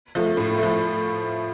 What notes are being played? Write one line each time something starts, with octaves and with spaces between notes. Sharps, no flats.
F3 A3
A2
F3 A3